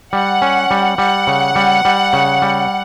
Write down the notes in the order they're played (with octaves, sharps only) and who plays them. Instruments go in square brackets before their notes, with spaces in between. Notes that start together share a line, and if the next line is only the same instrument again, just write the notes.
[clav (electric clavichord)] G3 [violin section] F#5
[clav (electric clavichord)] C#4
G3
[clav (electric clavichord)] G3 [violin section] F#5
[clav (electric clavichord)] C#3
G3
G3
C#3
G3